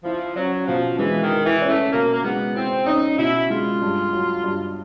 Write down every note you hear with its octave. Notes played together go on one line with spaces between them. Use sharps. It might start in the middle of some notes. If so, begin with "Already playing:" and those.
F3 E4
F#3 C#4
B2 F3
E3 G#3
D#3
E4
E3
C#4
A3
B2 A#3
A#3
G#3 B3
C4 E4
C#4 D#4
B2 E4
G#3 F4
G2
F#3
G2